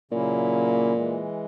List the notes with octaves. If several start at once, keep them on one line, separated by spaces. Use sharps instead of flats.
A#2 C#3 F#3 A#3 C#4 E4
E3 G#3